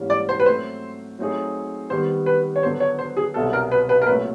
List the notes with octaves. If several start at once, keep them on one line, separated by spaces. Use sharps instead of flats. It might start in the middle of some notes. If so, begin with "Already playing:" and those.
Already playing: G#2 E3 G3 A#3 C#4
D5
C5
B4
F#3 A3 C4 C5
F#3 A3 C4 D#4 G#4
D#3 G3 B3 C5
B4
C#5
D3 F#3 B3 C5
C#5
C5
G#4
C2 B2 F#3 A4
A#4
B4
B4
A#4
A#2 F#3 A3 C4 B4